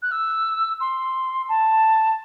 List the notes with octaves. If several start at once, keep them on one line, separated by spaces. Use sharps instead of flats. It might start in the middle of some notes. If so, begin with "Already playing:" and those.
F#6
E6
C6
A5